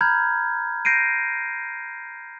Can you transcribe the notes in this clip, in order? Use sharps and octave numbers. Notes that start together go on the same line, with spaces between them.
A#5 B5 F6 G6 G#6
G6 A#6 C7 D7 D#7